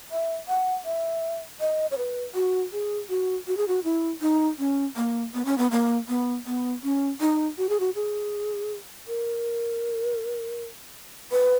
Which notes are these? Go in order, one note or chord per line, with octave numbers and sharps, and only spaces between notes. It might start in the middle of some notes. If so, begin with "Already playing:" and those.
E5
F#5
E5
D#5
C#5
B4
F#4
G#4
F#4
F#4
G#4
F#4
E4
D#4
C#4
A#3
B3
C#4
B3
A#3
B3
B3
C#4
D#4
F#4
G#4
F#4
G#4
A#4
B4